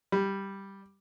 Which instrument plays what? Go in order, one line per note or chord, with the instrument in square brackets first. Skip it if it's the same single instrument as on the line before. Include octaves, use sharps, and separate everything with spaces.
[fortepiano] G3